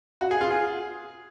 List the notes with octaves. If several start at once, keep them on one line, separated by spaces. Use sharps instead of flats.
F#4
G#4
F4
G#4